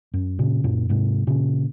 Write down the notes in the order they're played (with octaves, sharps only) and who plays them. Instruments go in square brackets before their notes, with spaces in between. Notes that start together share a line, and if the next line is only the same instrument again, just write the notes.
[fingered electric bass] F#2
A#2 C#3
F#2 A#2
G#2 C3
A#2 C#3